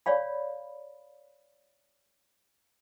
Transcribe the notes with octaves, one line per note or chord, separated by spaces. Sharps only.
C#5 D5 F5 B5